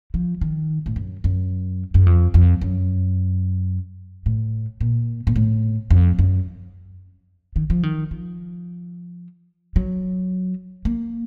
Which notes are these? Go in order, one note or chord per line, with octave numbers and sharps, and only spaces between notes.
F3
D#3
A2
F#2
F#2
F#2
F2
F2
F#2
A2
A#2
A#2
A2
F2
F#2
D#3
F3
D#3
F3
F#3
A#3